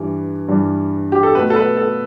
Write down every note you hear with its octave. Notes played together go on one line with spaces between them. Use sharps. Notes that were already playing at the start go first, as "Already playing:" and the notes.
Already playing: G2 E3 G3
G2 E3 G3
G4
A4
B2 A3 B4
A4
B4
A4